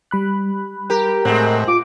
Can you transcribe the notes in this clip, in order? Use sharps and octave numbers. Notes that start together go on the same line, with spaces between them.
G3 B5 F#6
G4 A#4
A2 G#3 C4 F#5 F#6
F4 D6